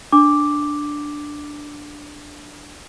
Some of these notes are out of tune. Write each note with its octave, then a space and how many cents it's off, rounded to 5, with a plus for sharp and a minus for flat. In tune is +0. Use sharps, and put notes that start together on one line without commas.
D4 +0 D6 +0